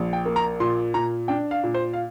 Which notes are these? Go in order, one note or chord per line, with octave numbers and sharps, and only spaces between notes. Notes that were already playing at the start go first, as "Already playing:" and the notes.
Already playing: A#1
G5
A#3
A#5
A#2 C6
A#2 A#5
D4 G5
F5
A#2
C5
F5